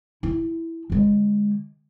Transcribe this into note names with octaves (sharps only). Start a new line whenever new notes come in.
E4
D3 G#3